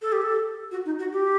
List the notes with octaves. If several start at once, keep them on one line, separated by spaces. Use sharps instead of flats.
A4
G4
A4
F#4
D#4
F#4
G4